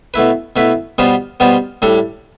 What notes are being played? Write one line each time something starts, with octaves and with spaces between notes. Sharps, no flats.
B2 A3 E4 B4
B2 A3 E4 B4
B2 G3 B3 F4 C5
B2 G3 B3 F4 C5
A2 G3 D4 A4